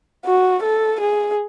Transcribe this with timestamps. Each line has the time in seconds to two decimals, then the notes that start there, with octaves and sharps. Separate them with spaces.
0.25 F#4
0.63 A4
1.00 G#4